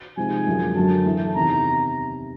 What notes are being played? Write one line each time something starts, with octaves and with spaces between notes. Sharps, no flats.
C3 F3 G#3 C4 D#4 G#5
F#2 D3 F3 G#3
F#2 D3 F#3 A5
A2 E3 A3
E2 C3 D#3 A#5